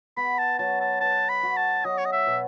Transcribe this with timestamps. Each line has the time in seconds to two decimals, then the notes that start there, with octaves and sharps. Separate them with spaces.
0.17 B3 B5
0.38 A5
0.59 F#3 A5
0.80 A5
1.01 B4 A5
1.29 B5
1.43 F#4
1.57 A5
1.84 F#3 D#5
1.98 C#5
2.05 D#5
2.13 E5
2.27 B2